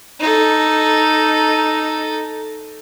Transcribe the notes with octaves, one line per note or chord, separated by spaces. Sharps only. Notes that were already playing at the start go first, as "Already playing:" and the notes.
D#4 A4